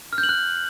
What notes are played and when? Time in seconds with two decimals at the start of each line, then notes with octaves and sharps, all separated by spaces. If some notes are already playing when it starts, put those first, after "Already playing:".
0.13 F6
0.18 G6
0.23 F#7
0.29 F#6